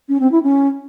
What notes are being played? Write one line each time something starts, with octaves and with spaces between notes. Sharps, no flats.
C#4
C4
E4
C#4